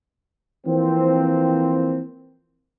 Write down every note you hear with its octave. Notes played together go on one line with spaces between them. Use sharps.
E3 F3 A#3 C4